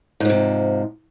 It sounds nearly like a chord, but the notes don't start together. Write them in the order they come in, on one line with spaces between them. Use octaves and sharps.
G#2 F3 C3